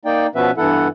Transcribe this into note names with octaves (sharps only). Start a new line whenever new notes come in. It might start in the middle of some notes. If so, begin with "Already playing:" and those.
A#3 D#4 D5 G5
B2 F3 B3 C#4 B4 E5
G2 E3 B3 E4 A4 F#5